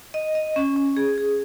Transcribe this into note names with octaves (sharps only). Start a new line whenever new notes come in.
D#5
D#5
C#4
C#4
G#4
G#4